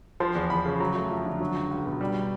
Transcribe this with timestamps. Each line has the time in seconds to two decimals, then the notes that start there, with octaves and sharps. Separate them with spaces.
0.20 F3 C6
0.35 E2
0.50 E2 B5
0.65 C#3
0.80 F#3 A#5
0.96 A3
1.10 F2
1.26 D3
1.40 F#3
1.56 C#2
1.71 C#2
1.86 B2
2.01 G3